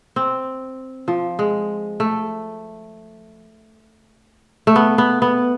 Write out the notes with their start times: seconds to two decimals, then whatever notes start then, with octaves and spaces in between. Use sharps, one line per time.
0.16 C4
1.08 F3
1.39 G#3
2.00 A3
4.67 A3
4.76 B3
4.98 B3
5.22 B3